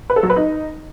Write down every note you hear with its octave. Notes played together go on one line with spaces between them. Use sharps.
B4
A4
F#3
B4
D#4